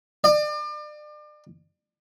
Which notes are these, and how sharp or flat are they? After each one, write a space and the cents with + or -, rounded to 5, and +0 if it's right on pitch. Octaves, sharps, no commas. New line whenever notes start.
D5 +35